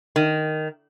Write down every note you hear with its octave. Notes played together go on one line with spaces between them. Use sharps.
D#3